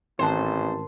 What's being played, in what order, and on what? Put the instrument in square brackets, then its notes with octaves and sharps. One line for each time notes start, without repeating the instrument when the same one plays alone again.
[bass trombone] A1 [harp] G#2 D#3 F#6 [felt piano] C4 A5 [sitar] C5